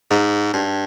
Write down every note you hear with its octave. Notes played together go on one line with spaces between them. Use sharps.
G#2
G2